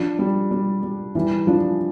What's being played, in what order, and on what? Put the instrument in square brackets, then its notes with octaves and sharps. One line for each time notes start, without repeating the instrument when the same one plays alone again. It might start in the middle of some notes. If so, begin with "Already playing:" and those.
Already playing: [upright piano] F3 [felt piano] D4
[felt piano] G3
G3
G3
[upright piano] E3 [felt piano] G3
[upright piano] F3 [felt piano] D4